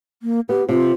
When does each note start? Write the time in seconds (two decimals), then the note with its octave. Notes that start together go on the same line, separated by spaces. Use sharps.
0.23 A#3
0.49 B3 G4
0.69 C3 F4